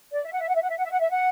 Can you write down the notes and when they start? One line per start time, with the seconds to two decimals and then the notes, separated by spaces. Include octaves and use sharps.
0.13 D5
0.25 E5
0.33 F#5
0.40 E5
0.48 F#5
0.55 E5
0.62 F#5
0.70 E5
0.78 F#5
0.85 E5
0.92 F#5
1.00 E5
1.10 F#5